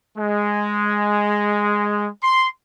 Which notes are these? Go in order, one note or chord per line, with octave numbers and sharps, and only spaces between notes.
G#3
C6